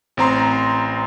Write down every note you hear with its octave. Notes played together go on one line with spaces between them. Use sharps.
A1 C4 A#5 C6